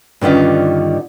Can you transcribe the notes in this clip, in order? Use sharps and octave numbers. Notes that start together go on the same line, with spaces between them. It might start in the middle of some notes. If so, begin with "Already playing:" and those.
G2 D3 D#3 C#4 F4